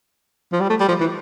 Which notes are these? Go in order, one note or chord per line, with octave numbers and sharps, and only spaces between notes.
F3
G3
A3
G3
F3
E3